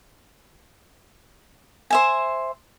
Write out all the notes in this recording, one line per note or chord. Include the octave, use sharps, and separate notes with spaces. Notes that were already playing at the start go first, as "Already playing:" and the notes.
C5 E5 G#5